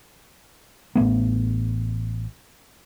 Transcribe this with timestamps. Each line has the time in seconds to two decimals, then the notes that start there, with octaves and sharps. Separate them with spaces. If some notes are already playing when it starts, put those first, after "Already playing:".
0.95 A1 D3 A3 B3